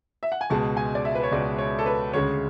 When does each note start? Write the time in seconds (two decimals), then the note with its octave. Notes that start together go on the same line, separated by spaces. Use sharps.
0.23 E5
0.32 F#5
0.41 G#5
0.50 C#2 B2 G#3 A5
0.77 G#5
0.95 D5
1.05 E5
1.15 B4
1.23 C#5
1.32 C#2 B2 G#3 D5
1.58 C#5
1.79 A4
1.86 B4
2.13 D2 C#3 G#3 C#5